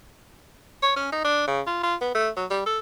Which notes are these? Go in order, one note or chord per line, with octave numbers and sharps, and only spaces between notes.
C#5
C#4
D#4
D4
C#3
F4
F4
B3
A3
F#3
G3
A4